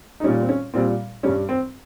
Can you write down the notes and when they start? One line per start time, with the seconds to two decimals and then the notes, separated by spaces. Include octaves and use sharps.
0.20 D#4
0.24 G3 C#4
0.28 A#2
0.41 C4
0.49 C#4
0.74 A#2 G3 C4
1.23 G2 G3 C#4
1.49 C4